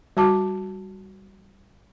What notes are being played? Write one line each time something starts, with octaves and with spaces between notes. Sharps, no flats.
G3 F#4 A5 D6